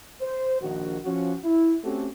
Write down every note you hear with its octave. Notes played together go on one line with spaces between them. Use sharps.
C5
A#1 D#3 F#4
F3 C#4 F#4
E4
A3 C4 C#4 F#4 G4 A4